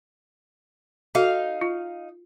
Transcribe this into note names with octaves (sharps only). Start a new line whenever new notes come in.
D#4 F#4 A4 F5
F4